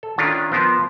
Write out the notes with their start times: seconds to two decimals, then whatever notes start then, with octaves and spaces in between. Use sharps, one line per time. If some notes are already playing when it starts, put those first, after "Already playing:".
0.03 A4
0.18 D#3 C#4 D4 F4
0.52 F3 B3 F4 A#4 C5